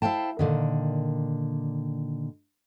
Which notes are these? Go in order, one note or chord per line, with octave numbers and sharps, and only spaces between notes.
E4 C5 F5 G5 A5
A#2 D3 D#3